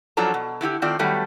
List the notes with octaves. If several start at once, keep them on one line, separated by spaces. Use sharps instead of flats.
F#2 F3 F#3 D4 A4 A#5
B2
D3 E4 F#4 G4
D#3 A3 C4 F4 D5
D#3 F#3 G3 A3 B3